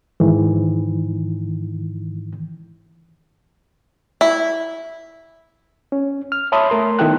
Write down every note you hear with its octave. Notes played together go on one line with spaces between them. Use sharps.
G#2 D#3 E3
E4
C#4
F6
C#5 E5 A5 B5 C6 D#6
A3 A#4 C6
D#3 B3 E4 A4 G5 F#6